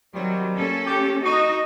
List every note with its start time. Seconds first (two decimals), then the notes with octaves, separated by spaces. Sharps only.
0.15 C3 D#3 F#3 G3
0.55 A#3 C#4 A4
0.86 G4
1.23 D#4 F#4 D#5